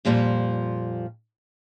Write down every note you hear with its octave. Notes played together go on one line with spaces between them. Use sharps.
F2 A#2 F3 G3